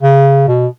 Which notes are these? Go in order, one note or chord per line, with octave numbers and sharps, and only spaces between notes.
C#3
B2